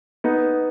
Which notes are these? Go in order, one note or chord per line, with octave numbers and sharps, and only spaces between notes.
B3 D#4